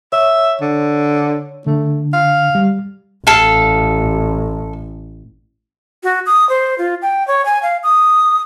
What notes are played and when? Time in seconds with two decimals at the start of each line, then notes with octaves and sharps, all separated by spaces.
0.12 C#5 E5
0.61 D3
1.67 D3 A3
2.13 F5
2.55 G3
3.27 A1 A4 F5
6.03 F#4
6.26 D#6
6.49 C5
6.78 F4
7.02 G5
7.27 C#5
7.45 G#5
7.62 F5
7.83 D#6